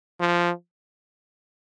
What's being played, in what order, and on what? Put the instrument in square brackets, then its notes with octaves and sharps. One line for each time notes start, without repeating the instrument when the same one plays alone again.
[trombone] F3